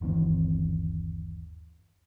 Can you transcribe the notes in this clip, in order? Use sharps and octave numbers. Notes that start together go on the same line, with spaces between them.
G1 D#2 E3 C4